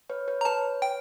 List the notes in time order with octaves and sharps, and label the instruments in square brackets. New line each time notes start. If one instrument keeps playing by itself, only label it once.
[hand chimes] B4 C#5
B4 C#5
[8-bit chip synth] A#5
[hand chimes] B4 C#5 [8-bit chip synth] A5
[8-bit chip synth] G5